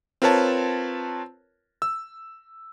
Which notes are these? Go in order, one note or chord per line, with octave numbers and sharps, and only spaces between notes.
C4 F4 A#4 B4 C#5 A5
E6